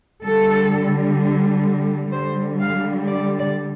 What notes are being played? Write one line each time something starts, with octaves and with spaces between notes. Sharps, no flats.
D3 G3 A4
D3 G3 C5
F5
D5
D5